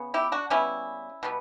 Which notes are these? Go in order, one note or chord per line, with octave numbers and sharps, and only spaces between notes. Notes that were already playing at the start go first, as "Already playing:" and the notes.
Already playing: C#3 B3
E4 G4
D4 F#4
C#3 G3 B3 C#4 E4
B2 G3 B3